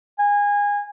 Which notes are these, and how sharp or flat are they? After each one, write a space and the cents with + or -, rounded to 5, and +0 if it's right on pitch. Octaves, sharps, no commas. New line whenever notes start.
G#5 -25